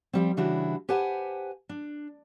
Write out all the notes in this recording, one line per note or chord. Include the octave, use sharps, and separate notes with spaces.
F3 G3 C4
C#3 E3 G3 D4 E4 F#4
G4 B4 C5 F#5 G#5 A5
D4